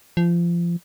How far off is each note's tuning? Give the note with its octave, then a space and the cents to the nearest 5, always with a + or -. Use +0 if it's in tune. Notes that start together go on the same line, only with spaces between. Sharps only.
F3 -25